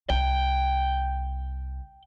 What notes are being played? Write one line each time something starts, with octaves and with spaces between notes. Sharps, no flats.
C2 G5